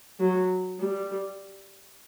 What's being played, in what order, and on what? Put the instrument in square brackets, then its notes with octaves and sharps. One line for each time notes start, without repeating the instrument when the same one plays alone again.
[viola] F#3
G3